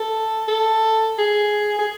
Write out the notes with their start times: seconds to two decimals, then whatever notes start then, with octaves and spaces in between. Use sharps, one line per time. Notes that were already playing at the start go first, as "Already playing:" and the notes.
Already playing: A4
0.48 A4
1.18 G#4
1.79 G#4